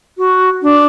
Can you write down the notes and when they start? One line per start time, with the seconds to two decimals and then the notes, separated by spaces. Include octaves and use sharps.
0.18 F#4
0.62 D4